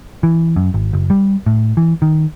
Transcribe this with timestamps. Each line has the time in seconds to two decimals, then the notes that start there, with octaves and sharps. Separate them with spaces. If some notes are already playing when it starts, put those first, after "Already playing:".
0.23 E3
0.56 F#2
0.74 G#1
0.93 F#1
1.10 G3
1.46 A2
1.77 E3
2.02 D#3